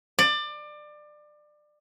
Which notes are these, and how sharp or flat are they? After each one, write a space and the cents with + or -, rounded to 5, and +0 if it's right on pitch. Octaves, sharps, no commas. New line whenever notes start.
D5 +25